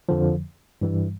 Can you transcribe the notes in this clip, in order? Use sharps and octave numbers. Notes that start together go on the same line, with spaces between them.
F2 D3 F3
G2 E3 G3